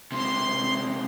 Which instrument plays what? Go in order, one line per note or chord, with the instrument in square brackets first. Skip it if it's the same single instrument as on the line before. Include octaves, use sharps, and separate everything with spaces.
[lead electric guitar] C#2 C3 [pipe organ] C6